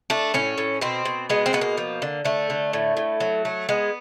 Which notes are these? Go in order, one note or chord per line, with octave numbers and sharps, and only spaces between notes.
A3 D4
A2 C#4
A2
B2 C4
B2
G#3 B3
C4
B2 B3
A#3
F3
D3
D3 A3
D3
A2
A2
F#3
A3
G#3 B3